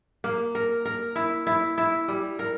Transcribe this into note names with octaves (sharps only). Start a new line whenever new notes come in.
A#3
A#4
A#4
E4
E4
E4
G3
A#4